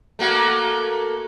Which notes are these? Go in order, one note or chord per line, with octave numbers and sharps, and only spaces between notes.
A3 A#3 F#4